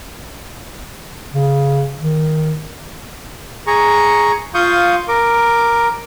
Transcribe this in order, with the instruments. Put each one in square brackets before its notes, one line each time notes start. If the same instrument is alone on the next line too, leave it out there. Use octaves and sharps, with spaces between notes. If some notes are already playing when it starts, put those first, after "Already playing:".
[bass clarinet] C#3
D#3
[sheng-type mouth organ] G#4 A#5 C#6
F4 F5 C#6 D#6 G6
A#4 D6